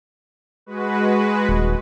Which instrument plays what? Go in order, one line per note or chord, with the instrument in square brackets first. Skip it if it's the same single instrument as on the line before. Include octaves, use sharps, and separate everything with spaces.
[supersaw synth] G#3 F#4 B4
[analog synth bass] D#1